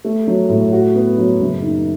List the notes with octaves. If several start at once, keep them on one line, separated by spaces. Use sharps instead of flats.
A3
F#3
A2
F#4
B3
F#3
F#1
D#3